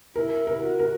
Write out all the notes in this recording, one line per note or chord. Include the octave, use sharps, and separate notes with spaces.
E4 A#4
A#4
F#4
A#4